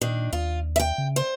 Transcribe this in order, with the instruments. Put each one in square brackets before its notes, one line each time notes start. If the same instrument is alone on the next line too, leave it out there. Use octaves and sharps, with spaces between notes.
[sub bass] A#2 [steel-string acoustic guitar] D#3 D4
[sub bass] D#2 [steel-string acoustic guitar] F4
[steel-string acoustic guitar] E5 G5
[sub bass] C#3
[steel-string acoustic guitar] C5